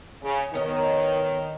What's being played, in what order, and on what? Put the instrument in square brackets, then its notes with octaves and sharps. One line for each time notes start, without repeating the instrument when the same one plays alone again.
[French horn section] C#3
[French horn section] D#3 [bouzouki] B3 C#4 D#5